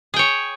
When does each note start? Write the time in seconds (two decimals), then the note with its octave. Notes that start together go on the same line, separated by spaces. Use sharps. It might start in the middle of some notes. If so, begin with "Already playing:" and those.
0.14 G#4
0.16 G5
0.19 C#5